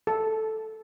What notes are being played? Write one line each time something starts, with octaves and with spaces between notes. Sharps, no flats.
A4